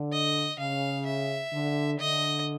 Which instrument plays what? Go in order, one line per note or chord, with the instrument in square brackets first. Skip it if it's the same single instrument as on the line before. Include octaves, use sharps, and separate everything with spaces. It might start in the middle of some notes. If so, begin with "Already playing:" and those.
Already playing: [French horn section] D3
[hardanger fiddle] D#5
[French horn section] C#3 [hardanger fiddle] F5
[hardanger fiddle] E5
[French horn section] D3
[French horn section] D3 [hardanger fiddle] D#5